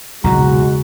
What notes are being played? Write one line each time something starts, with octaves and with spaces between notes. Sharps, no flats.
B1 E2 A#2 C#3 G#3 F#4 A#5